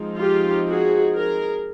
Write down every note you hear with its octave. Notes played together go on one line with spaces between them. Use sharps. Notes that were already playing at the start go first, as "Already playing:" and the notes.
Already playing: F3 G#3 C4 D#4
F4 G4
F#4 G#4
G#4 A#4